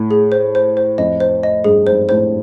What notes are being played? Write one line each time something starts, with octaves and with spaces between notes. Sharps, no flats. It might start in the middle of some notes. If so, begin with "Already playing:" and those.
Already playing: A2
G#4
C5
C5
C5
F2 D#5
C5
D#5
G2 G#4
G#2 C5
A2 C5